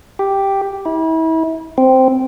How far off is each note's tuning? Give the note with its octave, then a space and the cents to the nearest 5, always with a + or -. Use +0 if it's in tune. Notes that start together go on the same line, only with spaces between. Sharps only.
G4 +0
E4 -35
C4 -5